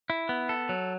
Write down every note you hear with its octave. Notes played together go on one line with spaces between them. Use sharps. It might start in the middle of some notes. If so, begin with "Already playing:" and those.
E4
B3
A4
F#3